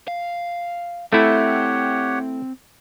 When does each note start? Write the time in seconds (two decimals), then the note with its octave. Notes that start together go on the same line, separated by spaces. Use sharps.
0.08 F5
1.13 A3 C4 E4 G4 C#5 F#5